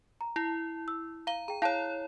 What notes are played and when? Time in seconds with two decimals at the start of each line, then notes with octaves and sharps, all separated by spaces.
0.21 A#5
0.36 E4 A#6
0.88 E6
1.27 F5 A#5 G7
1.48 G#4 G5 A#5
1.62 E4 C#5 F5 A5